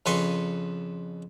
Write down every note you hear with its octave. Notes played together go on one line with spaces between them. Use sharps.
F2 C#3 B4 G#5 C6 C#6